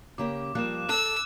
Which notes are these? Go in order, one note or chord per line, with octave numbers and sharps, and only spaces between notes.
C#3 A#3 G4 D6
F3 G3 A#3 F#6 E7
A4 A5 E6 F#6